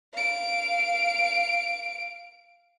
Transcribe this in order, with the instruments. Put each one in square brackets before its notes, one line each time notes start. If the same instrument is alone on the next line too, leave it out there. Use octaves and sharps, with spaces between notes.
[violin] F5 D7